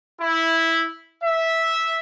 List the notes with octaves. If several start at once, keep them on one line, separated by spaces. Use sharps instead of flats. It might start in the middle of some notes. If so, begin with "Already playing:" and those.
E4
E5